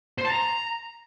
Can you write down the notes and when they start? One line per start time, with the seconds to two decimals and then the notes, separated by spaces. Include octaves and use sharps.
0.18 C5
0.25 A5
0.31 A#5